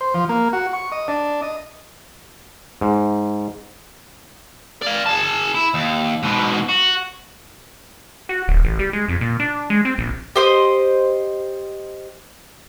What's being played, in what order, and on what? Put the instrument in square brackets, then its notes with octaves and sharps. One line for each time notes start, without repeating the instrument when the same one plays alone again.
[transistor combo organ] C5
F3
A#3
F#4
C#6
D#5
D4
D#5
[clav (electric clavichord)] G#2
[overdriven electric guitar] D5 F5
G#4 A5
E4
D#2
G#2 B2
F#4
[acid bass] F#4
D1
A1
G3
G#3
F2
A#2
D4
G#3
C4
A#1
[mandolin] G4 C5 D#5